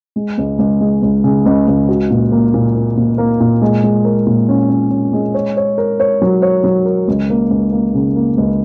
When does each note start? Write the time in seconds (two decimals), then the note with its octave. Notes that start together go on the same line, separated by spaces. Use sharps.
0.16 G#3
0.38 C#2
0.59 C#2
0.81 G#3
1.02 C#2
1.24 C#3
1.46 C#2
1.68 C#2
1.89 F#4
2.11 A#2
2.32 A#3
2.54 A#2
2.75 A#3
2.97 A#2
3.18 A#3
3.40 A#2
3.62 G#3
3.83 G#3
4.05 A#4
4.26 A#2
4.49 C#4
4.70 C#4
4.91 C#4
5.13 G#3
5.34 C#5
5.57 C#5
5.78 A#4
6.00 C#5
6.22 F#3
6.42 C#5
6.64 F#3
6.85 A#4
7.08 C#2
7.30 A#3
7.50 C#2
7.72 A#3
7.94 C#3
8.16 A#3
8.37 C#2